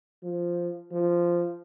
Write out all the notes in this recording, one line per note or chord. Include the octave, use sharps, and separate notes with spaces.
F3
F3